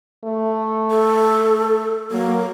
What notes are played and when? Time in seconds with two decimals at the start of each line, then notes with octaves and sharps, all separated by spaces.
0.24 A3
0.91 A4
2.11 F#3 A#3